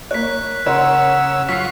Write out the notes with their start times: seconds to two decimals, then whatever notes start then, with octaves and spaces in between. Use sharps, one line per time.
0.11 A#3 C#5 F#6 B6
0.66 C#3 A#4 C#5 F#5 C6 E6
1.49 F#3 F4 C#6 B6 C7